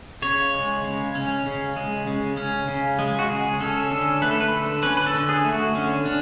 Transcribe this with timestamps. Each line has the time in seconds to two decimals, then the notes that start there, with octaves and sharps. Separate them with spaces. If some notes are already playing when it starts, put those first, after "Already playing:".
0.22 C#3 C#5
0.54 G#3
0.85 C#3
1.15 C#4
1.46 C#3
1.76 G#3
2.07 C#3
2.37 C#4
2.68 C#3
2.99 G#3
3.19 F#4
3.29 C#3 G#4
3.60 C#4 A4
3.91 D3 A4
4.22 A3 B4
4.31 A4
4.40 B4
4.52 D3 A4
4.83 C#4 B4
4.97 B4
5.06 A4
5.14 D3
5.29 G#4
5.45 A3
5.53 F#4
5.75 D3 C#4
6.06 C#4 D4